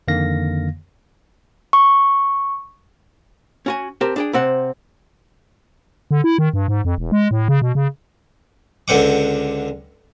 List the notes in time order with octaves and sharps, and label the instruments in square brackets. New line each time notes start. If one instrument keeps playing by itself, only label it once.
[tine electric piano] F2 D3 D#3 A#3 F5 A#6
[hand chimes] C#6
[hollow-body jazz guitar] C#4 F#4 G#5
C4 G4 A#4 A5
D4 G#4 G5
C3 C4 F#5
[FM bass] D3
E4
D#3
G2
G#2
F2
E1
G#3
A2
C#3
B2
C#3
[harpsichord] C#2 D3 C4 F#5 D6